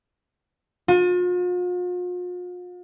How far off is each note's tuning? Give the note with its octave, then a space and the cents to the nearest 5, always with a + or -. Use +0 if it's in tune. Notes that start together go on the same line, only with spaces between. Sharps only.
F4 +45